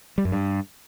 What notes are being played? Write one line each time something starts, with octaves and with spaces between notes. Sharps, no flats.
G3
F#2
G2